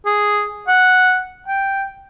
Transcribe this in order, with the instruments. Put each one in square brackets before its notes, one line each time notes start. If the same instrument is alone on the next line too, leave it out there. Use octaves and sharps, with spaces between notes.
[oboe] G#4
F#5
G5